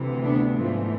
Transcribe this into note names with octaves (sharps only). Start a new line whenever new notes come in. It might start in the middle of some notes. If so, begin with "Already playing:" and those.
Already playing: D2 C3 E3
B3 D4
G#2 E3 F3 A3